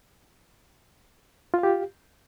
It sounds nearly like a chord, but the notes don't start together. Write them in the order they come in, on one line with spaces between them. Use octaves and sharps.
F4 F5 G4